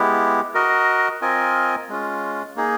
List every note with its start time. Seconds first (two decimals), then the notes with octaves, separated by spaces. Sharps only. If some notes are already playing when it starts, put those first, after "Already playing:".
Already playing: G#3 B3 E4 G4
0.54 F#4 A#4 D#5
1.21 C4 F4 A#4 D#5 G#5
1.89 G#3 C#4 F4
2.56 A#3 D#4 G#4